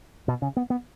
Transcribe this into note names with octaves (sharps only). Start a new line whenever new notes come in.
B2
C#3
B3
B3